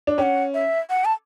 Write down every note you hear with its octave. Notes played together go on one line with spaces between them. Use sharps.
D4
C#4 F#5 G5
E5
F#5
A5